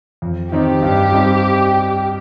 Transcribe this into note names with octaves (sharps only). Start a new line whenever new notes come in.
F2
D#3 C4 D#4 G4
G2
G3 C4 D#4